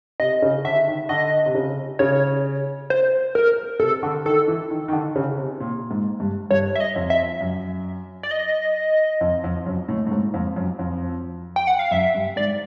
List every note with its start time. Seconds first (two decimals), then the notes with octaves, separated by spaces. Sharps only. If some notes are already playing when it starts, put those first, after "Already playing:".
0.20 C3 D#5
0.42 C#3
0.65 D3 E5
0.87 D#3
1.09 D3 D#5
1.46 C3
1.55 C#3
1.99 C#3 C#5
2.90 C5
3.35 A#4
3.80 C3 A4
4.03 D3
4.25 D#3 A4
4.48 E3
4.70 D#3
4.88 D#3
4.93 D3
5.16 C#3
5.38 C3
5.60 A#2
5.91 G#2
6.20 G2
6.51 G2 C#5
6.76 E5
6.80 D#5
6.96 F2
7.10 E5
7.41 F#2
8.23 D5
8.31 D#5
9.21 F2
9.44 F2
9.66 F#2
9.88 A2
10.07 A2
10.12 G#2
10.34 F2
10.56 F#2
10.79 F2
11.56 G5
11.67 F#5
11.79 F5
11.91 F#2 E5
12.15 G2
12.36 G#2 D5